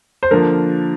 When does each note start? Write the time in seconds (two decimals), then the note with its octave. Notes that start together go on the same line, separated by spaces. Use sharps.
0.23 C5
0.31 D3 F3 A#3 A#4